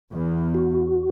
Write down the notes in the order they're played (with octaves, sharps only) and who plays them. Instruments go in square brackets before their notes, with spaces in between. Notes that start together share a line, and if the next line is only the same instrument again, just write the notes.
[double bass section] E2
[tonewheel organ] F#4